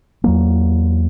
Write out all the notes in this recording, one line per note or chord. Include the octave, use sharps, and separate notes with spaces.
E2 F#3 A#3